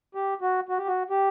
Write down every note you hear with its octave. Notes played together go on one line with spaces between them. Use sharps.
G4
F#4
F#4
G4
F#4
G4